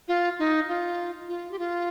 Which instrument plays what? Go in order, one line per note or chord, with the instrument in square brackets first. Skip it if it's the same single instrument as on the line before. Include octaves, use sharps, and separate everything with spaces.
[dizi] F4
D#4
F4
F4
G4
F4